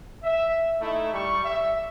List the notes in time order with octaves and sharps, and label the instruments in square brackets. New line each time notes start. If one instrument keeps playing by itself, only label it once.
[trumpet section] E5
A3 D#4 E4
G3 C#6
E5